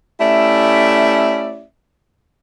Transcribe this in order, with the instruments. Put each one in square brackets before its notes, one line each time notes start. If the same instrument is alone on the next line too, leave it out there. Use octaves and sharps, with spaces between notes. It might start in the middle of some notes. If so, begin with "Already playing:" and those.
[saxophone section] A3 C#4 E4 G4 D5 E5